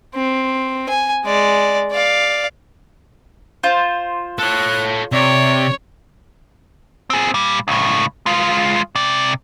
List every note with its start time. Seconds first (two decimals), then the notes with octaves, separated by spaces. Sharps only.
0.14 C4
0.89 G#5
1.25 G#3 D5
1.91 D5 F5
3.63 F4 C5
4.38 A4 C#5 F#6
5.12 C3 C#5 D5
7.10 C4 G#4
7.34 A#2 G3
7.68 C#2 A2
8.26 G#3 F4
8.95 C3 D5